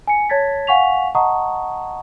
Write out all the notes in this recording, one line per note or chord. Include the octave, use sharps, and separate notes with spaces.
G#5 C#7
C#5 A5 G#6 A6 B6
F5 F#5 G#5 C#6 B6 F7
D#5 F#5 A5 A#5 C#6 D#6